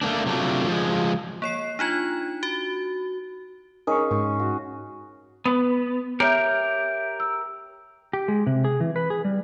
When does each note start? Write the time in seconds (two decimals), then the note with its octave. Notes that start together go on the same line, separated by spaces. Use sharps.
0.01 A3 A#3 C4 D4
0.26 C3 F#3 A3 D4 F4
0.67 F3 G#3
1.42 A#3 C#5 C7
1.79 D4 D#4 F4 G#6
2.43 F#4
3.87 C#4 D#4 G#4 A#4 C#6
4.11 G#2 C#6
4.39 F#4
5.45 B3
6.20 G4 A#4 C#5 E5 G6
7.20 E6
8.13 G4
8.28 G#3
8.47 C3
8.64 G#4
8.80 E3
8.96 B4
9.10 G#4
9.25 G3